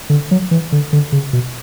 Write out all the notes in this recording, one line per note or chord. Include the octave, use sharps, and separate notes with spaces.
D3
F#3
E3
D3
D3
C#3
B2